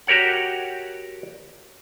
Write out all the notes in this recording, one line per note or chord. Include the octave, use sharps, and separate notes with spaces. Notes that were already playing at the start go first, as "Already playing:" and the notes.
F#4 G4 A#4 C#5 F#5